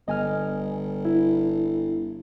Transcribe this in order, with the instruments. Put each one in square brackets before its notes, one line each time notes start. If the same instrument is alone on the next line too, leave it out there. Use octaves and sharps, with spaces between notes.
[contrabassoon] G1 [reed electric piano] D#5 G#5 F6
[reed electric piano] E4